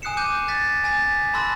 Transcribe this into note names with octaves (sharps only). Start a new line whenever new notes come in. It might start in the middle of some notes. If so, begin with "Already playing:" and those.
G#5 D#6 F#6 C7 C#7 E7
D6 F#6 G6 D#7
F#6 A6 B6
G#5 A6 B6
G#5
A5 B5 C6 E6 F#6 A#6